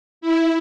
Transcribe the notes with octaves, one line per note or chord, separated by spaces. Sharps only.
E4